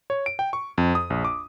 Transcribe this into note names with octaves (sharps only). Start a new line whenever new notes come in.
C#5
D7
G5
C#6
F2
D#6
A#1
D6